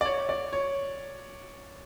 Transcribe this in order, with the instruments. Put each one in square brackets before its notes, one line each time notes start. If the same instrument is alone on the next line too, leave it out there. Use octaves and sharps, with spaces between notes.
[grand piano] D5
C#5
D5
C#5